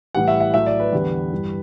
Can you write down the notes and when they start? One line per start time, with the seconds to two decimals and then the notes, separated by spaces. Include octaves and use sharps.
0.15 A2 E3 G3 F#5
0.28 E5
0.40 E5
0.54 A2 F#3 A3 E5
0.66 D5
0.80 B4
0.93 E2 D3 G3
1.32 G2 E3 G3